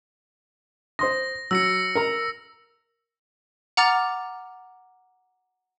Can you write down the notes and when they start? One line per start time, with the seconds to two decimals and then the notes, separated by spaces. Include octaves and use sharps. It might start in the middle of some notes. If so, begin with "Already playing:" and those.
0.99 C5 C6 D#6 A#6
1.51 F#3 E6 A#6 C#7
1.95 A#4 A#5
3.77 F#5 A#5 D6 F6 A6 F7